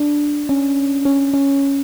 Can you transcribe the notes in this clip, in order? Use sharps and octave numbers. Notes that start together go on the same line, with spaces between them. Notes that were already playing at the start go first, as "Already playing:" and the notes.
Already playing: D4
C#4
C#4
C#4